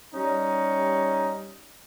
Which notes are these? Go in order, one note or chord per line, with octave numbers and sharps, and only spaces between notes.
G3 C#4 D#4